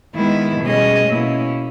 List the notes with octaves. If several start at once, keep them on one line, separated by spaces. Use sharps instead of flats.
D#3 G#3 B3 E4
B2 G3 C#4 G#4 D#5
B2 A#3 C#4 E4